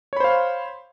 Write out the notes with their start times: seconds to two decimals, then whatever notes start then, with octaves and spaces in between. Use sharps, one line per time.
0.13 C#5
0.17 B5
0.20 C5
0.24 F5